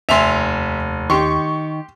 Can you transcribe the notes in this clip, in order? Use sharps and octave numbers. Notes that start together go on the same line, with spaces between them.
F1 D#2 E5 G#5 C6 F7
D#3 G4 C6 C#6